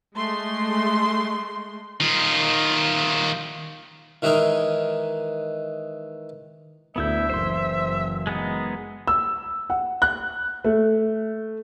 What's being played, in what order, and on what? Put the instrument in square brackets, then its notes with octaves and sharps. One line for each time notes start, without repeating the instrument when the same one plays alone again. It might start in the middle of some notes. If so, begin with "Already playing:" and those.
[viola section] G#3 A3 C6
[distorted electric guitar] D#3 F4
[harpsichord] D#3 E3 G#3 D#4 A#4
[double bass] D2 [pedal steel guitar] B3 E4 G6 [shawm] E5
[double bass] F#1 E3 [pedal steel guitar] C5 C6
[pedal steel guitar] G#3 B3 D#4
[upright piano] E6
F#5
F#6
A3